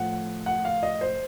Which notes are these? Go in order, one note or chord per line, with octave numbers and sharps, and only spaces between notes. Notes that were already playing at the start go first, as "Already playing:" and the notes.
Already playing: A2 F3 F#5
F#5
F5
D#5
C5